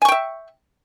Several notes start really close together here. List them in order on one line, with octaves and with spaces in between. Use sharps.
G#5 C#6 G5 E5